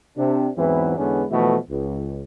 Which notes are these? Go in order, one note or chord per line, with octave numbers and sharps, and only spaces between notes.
C3 D4
E2 G#2 E3 F#3 B3 C4
E2 D3 G#3 B3 C#4 D4
B2 E3 F3 A3
C#2